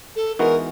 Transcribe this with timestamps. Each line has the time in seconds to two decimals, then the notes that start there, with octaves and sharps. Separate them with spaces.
0.16 A4
0.39 E3 G#3 B3 D#4 F#4 A#4